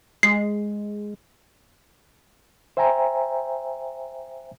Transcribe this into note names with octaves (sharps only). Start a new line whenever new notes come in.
G#3 C7
C5 E5 G5 G#5 A#5